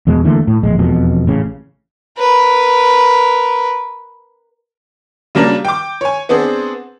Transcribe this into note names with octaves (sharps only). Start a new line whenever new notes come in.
E2 B2 G#3
D3 E3 A3 A#3
A2
D1 A#1 G#3
E1 F2 B2
A1 C#3
A#4 B4
C#3 F#3 G3 A#3 D4 A#4
G5 D6
C#5 G#5
B3 C4 D4 G#4